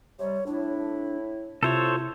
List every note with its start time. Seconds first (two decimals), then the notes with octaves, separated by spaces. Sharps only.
0.19 C3 G3 C#5
0.47 A2 D4 E4
1.63 C3 E4 F4 A4 C5 C#5